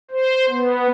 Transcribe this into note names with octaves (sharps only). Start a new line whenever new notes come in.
C5
B3